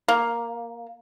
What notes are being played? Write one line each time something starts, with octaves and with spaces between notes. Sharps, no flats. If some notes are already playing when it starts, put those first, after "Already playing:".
A#3